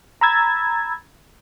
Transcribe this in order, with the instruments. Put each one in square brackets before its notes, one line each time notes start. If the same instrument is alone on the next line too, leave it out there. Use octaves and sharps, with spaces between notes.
[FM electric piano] A#5 B5 E6 G#6 A6